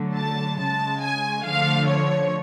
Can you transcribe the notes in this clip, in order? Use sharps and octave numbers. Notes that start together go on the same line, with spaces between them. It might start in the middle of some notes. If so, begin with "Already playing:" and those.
Already playing: D3 F#3 A3
A5
C#3 G#3 A5
G#5
D3 F3 A3 F5
C#5